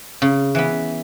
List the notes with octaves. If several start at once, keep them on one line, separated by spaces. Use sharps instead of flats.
C#3
E3 B3